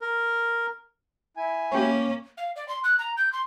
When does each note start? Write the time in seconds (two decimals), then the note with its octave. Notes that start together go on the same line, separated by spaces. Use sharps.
0.01 A#4
1.37 E4 G#5
1.71 A#3 C#4 G4 C#5
2.37 F5
2.56 D5
2.68 C6
2.84 F#6
2.99 A#5
3.17 G6
3.33 C6